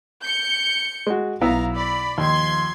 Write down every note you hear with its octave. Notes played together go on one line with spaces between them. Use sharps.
G6 C#7
G#3 F#4
B1 B3 E4 F5 A#5
D5 B5
D#2 F3 C6 G#6